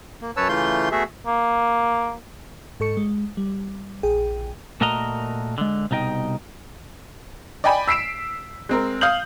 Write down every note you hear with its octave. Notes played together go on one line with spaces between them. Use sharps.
A#3
F#2 B4 C#5 A5 E6
C#3 E3 A3 F4 C6 G6
A3 B3 F#4 G#4 E5
A#3
G#2 A4 C#6 C#7
G#3
G3
A#1 G#4 G5
A#2 A3 F#4 A#4 D#5 A#5
D3 G#3
C2 B2 D#4 D#5 G5
D5 D#5 G5 G#5 B5
E6 B6 C7 D7 E7
G#3 C4 A#4
F5 D#6 G6 F#7